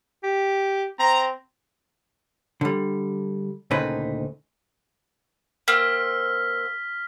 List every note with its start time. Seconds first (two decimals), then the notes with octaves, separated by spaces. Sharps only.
0.23 G4
0.99 C4 A#5
2.61 D3 G3
3.71 D2 A#2 C#3 C4 D#4 B4
5.68 A#3 C4 F6 B6